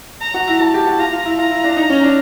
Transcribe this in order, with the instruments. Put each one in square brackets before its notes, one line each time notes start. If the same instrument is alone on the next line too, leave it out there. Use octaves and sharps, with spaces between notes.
[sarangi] A#5
[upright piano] F#4
E4
[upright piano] F#4 [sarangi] A5
[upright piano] G4
F#4
[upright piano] F4 [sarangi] A#5
[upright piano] F4
E4
[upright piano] F4 [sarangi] A#5
[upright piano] E4
D4
D#4
C#4
D4